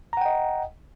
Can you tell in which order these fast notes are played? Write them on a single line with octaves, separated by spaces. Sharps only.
A#5 F#5 G5 D#5